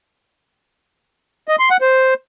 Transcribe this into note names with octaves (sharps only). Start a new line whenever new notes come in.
D#5
C6
F#5
C5